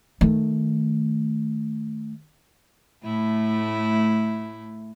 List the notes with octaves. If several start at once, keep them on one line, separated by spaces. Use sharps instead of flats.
D#3 A3
A2 A3 E4